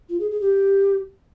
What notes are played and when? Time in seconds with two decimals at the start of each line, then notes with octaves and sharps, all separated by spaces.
0.09 F4
0.20 G#4
0.30 G#4
0.41 G4